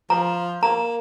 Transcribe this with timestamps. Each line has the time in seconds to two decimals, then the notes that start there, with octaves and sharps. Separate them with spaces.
0.10 F3 A#5
0.63 A#3 A#5